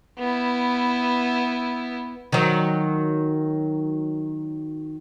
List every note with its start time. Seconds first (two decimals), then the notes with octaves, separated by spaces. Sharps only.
0.19 B3 E4
2.32 D#3 F#3